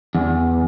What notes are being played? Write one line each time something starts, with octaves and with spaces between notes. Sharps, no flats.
E2